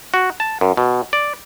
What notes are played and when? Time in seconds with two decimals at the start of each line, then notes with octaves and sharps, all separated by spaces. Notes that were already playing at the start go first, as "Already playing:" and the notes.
0.14 F#4
0.40 A5
0.61 F#2
0.77 B2
1.13 D5